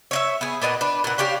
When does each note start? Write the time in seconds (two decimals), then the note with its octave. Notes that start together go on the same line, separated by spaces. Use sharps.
0.11 C#5 D#5 E5
0.41 B3 G#4
0.62 A#2 B3 D#5 F#5
0.81 D4 B4
1.04 A#2 F#5
1.18 C#4 D4 G4 F5